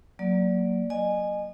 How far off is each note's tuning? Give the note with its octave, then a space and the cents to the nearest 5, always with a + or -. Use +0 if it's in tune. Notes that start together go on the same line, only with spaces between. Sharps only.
F#3 +0 A#3 +0 D5 -10
D#5 -30 G#5 +0